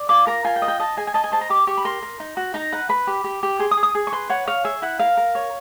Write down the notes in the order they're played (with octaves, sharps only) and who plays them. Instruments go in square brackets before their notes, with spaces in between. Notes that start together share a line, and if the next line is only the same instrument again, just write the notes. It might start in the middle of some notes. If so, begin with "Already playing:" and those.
Already playing: [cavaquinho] D5
F4 D6
A#4 A#5
F4 G#5
G5
D#5
G5
D#5 A5
G#4 G#5
G#5
D#5 A5
G#5
C5 A5
A#5
G4 D6
G4 C#6
B5
A#4 C6
A#4
D#4
F#4
D#4 A#5
B4 F#5
B4 B5
G4
G4
G4
G#4 C6
D#6
G#4
D#6
G#4
C#6
B4 C6
C#5 F#5
C#5 F5
G#4 E5
E4 F#5
A#4 F5
A#4
C#5